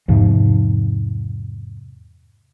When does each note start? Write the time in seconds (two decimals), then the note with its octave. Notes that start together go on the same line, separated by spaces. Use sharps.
0.08 E2 G#2 C3 F3